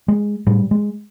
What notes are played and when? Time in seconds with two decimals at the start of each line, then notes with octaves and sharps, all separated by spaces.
0.08 G#3
0.47 A2 G3
0.71 G#3